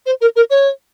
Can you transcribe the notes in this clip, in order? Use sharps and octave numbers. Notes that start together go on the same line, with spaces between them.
C5
A#4
A#4
C#5